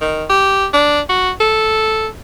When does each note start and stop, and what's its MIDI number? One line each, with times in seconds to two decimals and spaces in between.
0.01 0.24 51
0.30 0.66 67
0.73 1.00 62
1.09 1.31 66
1.41 2.08 69